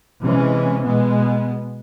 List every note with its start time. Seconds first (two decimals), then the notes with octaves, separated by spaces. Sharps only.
0.22 C3 E3 G#3 C#4
0.85 B2 G#3 B3